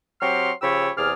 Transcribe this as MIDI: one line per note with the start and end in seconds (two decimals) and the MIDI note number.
0.22 0.52 54
0.22 0.52 60
0.22 0.52 67
0.22 0.52 84
0.22 0.52 85
0.22 0.52 89
0.62 0.90 49
0.62 0.90 53
0.62 0.90 67
0.62 0.90 73
0.62 0.90 83
0.62 0.90 88
0.97 1.13 40
0.97 1.13 48
0.97 1.13 68
0.97 1.13 74
0.97 1.13 89